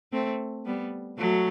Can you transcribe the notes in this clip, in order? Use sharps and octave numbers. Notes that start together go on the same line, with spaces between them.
A3 C4
G3 B3
F#3 A3